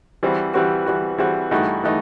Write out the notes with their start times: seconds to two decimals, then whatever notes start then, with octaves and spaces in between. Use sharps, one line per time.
0.23 E3 G3 C4 F#4
0.54 E3 G3 C4 F#4
0.86 E3 G3 C4 F#4
1.18 E3 G3 C4 F#4
1.51 G2 E3 A3 D#4 F#4
1.84 E3 A3 D#4 F#4